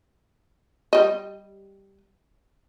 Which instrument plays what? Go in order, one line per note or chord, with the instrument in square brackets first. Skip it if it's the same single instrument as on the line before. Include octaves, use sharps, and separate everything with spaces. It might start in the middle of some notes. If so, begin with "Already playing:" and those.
[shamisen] G3 D#5